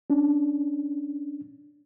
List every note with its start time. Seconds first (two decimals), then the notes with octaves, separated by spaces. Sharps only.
0.10 C#4 D4